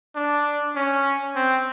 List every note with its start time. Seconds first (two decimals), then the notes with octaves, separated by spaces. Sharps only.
0.16 D4
0.76 C#4
1.36 C4